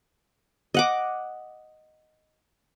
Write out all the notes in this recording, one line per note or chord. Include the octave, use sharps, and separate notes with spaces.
D#5 F#5 D6